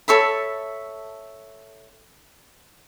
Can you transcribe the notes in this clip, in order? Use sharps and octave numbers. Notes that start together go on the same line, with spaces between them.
A4 C#5 E5 B5